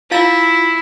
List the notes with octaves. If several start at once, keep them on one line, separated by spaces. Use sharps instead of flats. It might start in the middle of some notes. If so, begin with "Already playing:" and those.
E4 F4 F5 A6